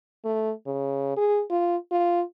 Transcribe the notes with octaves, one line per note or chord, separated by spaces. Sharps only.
A3
C#3
G#4
F4
F4